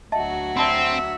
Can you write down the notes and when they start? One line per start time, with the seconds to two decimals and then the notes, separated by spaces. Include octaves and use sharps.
0.12 D2 F#3 F#4 D#5 E5 A5
0.57 C4 D5 E5 A5 B5